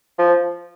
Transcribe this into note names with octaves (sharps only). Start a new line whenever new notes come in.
F3